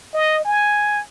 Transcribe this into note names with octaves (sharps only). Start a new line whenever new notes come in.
D#5
G#5